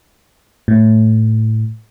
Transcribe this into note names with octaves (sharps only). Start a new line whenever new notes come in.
A2